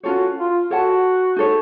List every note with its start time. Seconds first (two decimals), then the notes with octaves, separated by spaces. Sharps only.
0.03 C#4 F4 F#4 A4 C#5
0.37 F4
0.70 F#4 A4 C#5 F#5 A5
1.36 D#4 A4 C#5